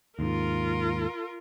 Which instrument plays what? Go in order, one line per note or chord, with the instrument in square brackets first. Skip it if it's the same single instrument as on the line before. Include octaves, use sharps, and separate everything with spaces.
[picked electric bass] D#2 G#2 [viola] F4 A#4